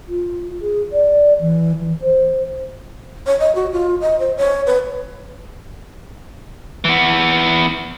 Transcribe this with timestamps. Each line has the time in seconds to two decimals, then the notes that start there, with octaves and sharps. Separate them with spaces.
0.08 F4
0.62 G#4
0.92 D5
1.41 E3
1.80 E3
2.01 C5
3.27 C#5
3.40 D#5
3.55 F#4
3.72 F4
4.01 D#5
4.20 C5
4.37 C#5
4.67 B4
6.85 E3 B3